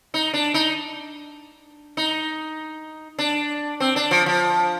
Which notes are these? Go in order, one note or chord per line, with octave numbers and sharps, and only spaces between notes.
D#4
D4
D#4
D#4
D4
C4
D4
F3
F3